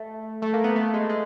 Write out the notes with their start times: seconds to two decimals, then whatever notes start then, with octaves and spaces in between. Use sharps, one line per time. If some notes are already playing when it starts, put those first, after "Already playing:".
Already playing: A3
0.42 A3
0.54 A#3
0.64 B3
0.76 A3
0.94 G#3
1.10 G#3